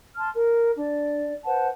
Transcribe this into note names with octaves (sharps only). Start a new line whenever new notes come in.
A5 C6 F6
A#4
D4 D5
B4 C5 F#5 A5